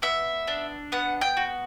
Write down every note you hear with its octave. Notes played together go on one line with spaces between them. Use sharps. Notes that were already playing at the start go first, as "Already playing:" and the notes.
B3 E5
D4
B3 F#5
G5
F#4